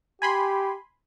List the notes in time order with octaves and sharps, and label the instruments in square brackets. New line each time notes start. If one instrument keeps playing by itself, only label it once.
[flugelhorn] G4 [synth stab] G#5 B5 C6